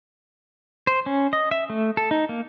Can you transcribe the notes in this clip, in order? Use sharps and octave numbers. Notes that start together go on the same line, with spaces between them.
C5
C#4
D#5
E5
A3
A4
D#4
A#3